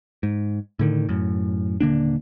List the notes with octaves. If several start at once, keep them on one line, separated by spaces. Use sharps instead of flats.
G#2
A2 D3 D#3
F#2 A2
D#1 D3 A#3 D4